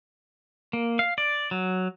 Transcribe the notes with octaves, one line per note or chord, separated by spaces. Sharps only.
A#3
F5
D5
F#3